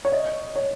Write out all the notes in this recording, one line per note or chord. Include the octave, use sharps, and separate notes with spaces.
C#5
D#5
C#5